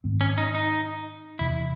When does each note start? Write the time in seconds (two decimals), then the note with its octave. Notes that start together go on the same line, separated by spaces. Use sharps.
0.04 G#2 D#3 A3 C4
0.21 C#4
0.38 D#4
0.55 D#4
1.39 E2 C3 E3 E4